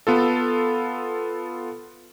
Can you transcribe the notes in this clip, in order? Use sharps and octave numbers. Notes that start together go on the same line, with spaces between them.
B3 F4 A4